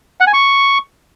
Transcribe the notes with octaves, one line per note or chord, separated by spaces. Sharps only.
F#5
G#5
C#6